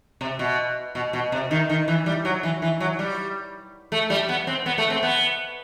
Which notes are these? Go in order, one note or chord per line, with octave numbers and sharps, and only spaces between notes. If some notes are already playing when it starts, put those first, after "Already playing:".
C3
B2
B2
B2
C3
D#3
D#3
E3
G3
F#3
E3
E3
F#3
G3
A3
G3
B3
C4
B3
A3
C4
B3